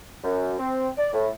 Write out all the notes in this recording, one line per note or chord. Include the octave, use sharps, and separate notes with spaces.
F#2
C4
D5
A2